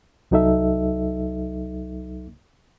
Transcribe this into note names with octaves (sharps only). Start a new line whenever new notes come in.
C2 F#3 D#4 A4 E5